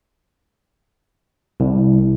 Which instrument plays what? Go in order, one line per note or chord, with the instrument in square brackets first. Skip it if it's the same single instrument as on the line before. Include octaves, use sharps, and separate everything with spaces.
[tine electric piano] C2